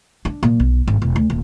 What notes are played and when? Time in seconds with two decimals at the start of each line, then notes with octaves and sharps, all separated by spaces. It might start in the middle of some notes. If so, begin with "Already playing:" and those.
0.25 D4
0.43 A#2
0.60 B1
0.87 G#1
1.02 E1
1.16 D2
1.30 D#1